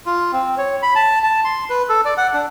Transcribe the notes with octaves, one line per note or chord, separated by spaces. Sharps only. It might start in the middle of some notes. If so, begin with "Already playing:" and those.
F4
C4
C#5
B5
A5
A5
C6
B4
A4
D5
F#5
D4